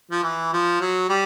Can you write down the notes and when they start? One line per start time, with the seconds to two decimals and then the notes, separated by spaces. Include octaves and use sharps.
0.11 F3
0.23 E3
0.53 F3
0.81 F#3
1.09 G3